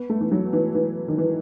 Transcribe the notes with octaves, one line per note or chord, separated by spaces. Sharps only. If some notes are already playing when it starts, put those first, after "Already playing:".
Already playing: B3
A3
E3
F#3
E3
E3
D#3
E3